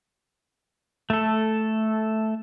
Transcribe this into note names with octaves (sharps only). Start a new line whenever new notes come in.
A3 A4